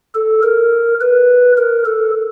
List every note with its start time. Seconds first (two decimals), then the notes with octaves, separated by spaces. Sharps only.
0.15 A4
0.43 A#4
1.01 B4
1.58 A#4
1.86 A4